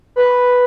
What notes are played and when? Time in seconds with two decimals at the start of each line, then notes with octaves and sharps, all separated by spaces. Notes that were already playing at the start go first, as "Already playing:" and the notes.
0.16 B4